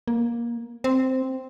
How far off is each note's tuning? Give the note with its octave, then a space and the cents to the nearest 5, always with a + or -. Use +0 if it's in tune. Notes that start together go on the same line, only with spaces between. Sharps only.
A#3 +15
C4 -5